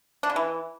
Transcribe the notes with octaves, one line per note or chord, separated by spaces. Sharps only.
D4
C#3
E3